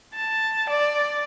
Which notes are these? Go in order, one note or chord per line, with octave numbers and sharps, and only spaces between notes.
A5
D5